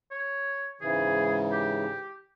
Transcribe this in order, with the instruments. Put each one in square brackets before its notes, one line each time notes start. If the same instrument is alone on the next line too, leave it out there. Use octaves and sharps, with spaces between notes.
[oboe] C#5
[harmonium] G#2 C#3 E3 [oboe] G#4
[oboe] G4